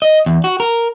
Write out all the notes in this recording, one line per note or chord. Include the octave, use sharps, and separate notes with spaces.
D#5
E2
F#4
A#4